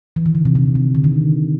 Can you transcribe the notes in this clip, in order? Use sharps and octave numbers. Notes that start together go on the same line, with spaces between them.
E3
D#3
D3
C3
C3
C3
D3
D#3